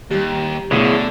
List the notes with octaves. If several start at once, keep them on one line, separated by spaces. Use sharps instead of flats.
D#2 G3 G4
B2 D3 A3 E4 G#4 C#5